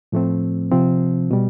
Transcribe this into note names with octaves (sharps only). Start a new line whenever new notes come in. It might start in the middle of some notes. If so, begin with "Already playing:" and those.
A2 F3 A3 C4
C3 F3 C4
B2 G3